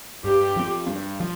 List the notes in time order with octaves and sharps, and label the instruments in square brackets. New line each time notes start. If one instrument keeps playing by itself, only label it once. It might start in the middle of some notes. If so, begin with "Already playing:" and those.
[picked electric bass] G2 [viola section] G4
[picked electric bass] F3 C4
G2
F3